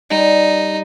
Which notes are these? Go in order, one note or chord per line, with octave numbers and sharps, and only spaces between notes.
G3 D#4